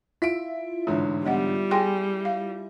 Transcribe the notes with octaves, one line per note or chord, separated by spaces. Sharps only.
E4 F4 E5 B6 D7
A1 G#2 D3
G3 B3 D#5 F#5
G#4 G5 G#5 C6 A#6
F5